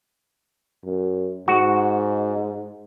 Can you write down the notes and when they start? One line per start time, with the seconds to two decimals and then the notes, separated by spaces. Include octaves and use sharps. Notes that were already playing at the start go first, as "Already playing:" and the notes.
0.84 F#2
1.48 G#2 F#4